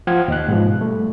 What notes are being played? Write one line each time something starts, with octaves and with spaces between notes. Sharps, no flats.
F3 C5 F#5 G5 F6 G#6
D#2 D#5 F#6
G#2 B2 F3
G3 A3